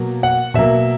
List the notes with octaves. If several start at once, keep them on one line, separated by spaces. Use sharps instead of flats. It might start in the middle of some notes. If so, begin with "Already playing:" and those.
Already playing: B2 F#3 A#3
F#5
B2 F#3 A#3 E5